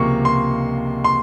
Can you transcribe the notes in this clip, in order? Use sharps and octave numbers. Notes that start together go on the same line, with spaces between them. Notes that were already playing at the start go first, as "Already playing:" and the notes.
Already playing: C#2 C3 F3 A#3 C#6
C6
C6